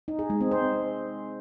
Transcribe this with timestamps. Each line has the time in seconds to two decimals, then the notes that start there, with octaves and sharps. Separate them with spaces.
0.08 D#4
0.19 G#4
0.30 G#3
0.41 C4
0.51 C5